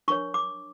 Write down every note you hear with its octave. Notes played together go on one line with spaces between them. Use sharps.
D4 A#4 C#5 C#6
D6